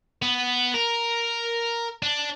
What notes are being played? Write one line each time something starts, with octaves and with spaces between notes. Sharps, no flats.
B3
A#4
D4